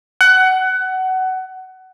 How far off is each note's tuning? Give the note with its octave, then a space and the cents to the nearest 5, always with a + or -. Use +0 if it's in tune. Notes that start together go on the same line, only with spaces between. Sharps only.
F#5 +20